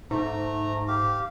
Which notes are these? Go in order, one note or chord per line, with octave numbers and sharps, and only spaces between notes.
G#2 A3 A#5
G4 F5